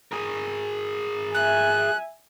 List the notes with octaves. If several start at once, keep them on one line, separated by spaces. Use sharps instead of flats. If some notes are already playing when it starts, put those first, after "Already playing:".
G#4 A#4
E5 G#5 F#6